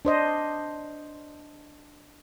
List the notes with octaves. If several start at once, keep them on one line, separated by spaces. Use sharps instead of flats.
D4 C5 D#5